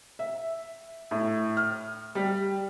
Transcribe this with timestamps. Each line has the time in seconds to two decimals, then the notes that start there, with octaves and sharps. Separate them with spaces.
0.19 E5
1.11 A2
1.57 F6
2.15 G3